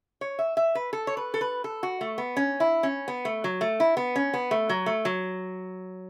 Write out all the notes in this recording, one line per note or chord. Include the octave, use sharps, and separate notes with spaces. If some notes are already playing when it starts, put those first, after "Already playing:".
C#5
E5
E5
B4
A4
C#5
B4
A4
B4
A4
F#4
A3
B3
C#4
E4
C#4
B3
A3
F#3
A3
E4
B3
C#4
B3
A3
F#3
A3
F#3